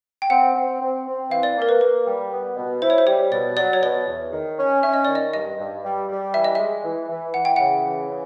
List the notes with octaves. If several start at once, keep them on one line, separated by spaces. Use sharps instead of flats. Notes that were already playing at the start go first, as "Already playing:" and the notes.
G5
C4 F#5
C4
C4
C4
E3 F5
D5
A#3
A#4
B4
A#3 B4
G3
B3
B2
E4 C5
C#5
C5
G3 C#5
B2 D5
F#3 D5
C#5
B2 D5
E2
D#3
C#4
C#4 E5
D#5
D#3 D5
D#5
G2 D#5
G2
G3
G3
E3 E5
D#5
G#3 E5
E3
E3
E3 F#5
G5
C#3 F#5
E3
C#3